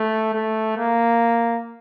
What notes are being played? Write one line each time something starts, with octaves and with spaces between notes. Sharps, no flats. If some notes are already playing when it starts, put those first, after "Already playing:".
Already playing: A3
A3
A#3